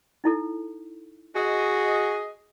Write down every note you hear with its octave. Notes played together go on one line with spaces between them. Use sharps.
D#4 E4 A4
F#4 G#4 D#5